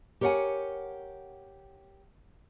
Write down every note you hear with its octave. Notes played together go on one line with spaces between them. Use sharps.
G4 A#4 C#5 D5 F#5 G#5